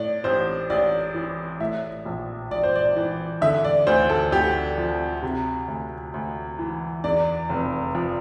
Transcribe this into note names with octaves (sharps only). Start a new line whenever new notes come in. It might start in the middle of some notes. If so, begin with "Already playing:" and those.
Already playing: A2 D5
A1 C5
A1 D5
E3
A2 E5
A#1
A#1 D5
C5
D5
E3
D3 E5
D5
D2 C5
A4
D2 G4
F3
C3
D2
D2
E3
E2 D5
F1
F3